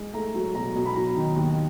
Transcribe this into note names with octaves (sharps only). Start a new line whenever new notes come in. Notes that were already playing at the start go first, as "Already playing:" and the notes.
Already playing: G#3
A3 A#5
F#3
B2 A#5
B2
B5
F#3 A#5
D#3
D#2